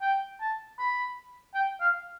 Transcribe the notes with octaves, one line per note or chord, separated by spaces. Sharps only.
G5
A5
B5
G5
F5